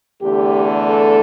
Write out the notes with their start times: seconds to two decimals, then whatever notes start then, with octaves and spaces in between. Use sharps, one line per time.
0.20 E2 D3 A3 G4
0.88 A4